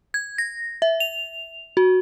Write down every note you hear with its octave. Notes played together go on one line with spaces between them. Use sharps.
G#6
A#6
E5
F7
F#4